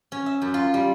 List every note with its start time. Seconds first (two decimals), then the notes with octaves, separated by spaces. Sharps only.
0.12 C#4
0.26 E5
0.42 F#2
0.54 F4
0.74 G3